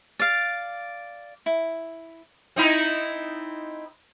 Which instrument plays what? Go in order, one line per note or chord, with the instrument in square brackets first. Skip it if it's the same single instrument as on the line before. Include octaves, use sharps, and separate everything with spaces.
[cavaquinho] D5 F5
E4
[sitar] C4 D#4 E4